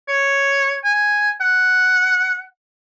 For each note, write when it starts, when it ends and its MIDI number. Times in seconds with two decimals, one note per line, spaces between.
0.08 0.76 73
0.84 1.31 80
1.41 2.42 78